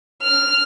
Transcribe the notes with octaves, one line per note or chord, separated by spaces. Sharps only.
F6